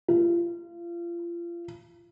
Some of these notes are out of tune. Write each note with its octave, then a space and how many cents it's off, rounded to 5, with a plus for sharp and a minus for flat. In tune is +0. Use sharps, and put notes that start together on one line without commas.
F4 -30